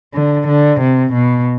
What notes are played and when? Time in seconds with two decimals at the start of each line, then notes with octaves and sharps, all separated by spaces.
0.14 D3
0.48 D3
0.81 C3
1.13 B2